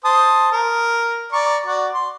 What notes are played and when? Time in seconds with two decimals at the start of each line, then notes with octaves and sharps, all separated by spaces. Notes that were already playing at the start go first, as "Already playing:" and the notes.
0.05 C5 A5 D#6
0.52 A#4
1.32 D5 A#5 C#6
1.66 F#4 D5
1.94 C6